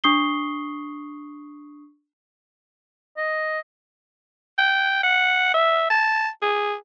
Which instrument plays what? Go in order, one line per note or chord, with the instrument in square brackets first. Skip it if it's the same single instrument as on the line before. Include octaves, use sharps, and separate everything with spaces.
[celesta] D4 C#6 D#6 C7 G7
[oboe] D#5
[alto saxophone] G5
F#5
E5
A5
G#4